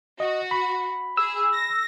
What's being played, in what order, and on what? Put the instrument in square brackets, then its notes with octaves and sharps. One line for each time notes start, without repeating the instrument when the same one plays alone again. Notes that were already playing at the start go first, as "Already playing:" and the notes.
[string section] F#4 [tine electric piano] D#5
[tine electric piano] B5
[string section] G#4 [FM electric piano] E6
[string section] A#6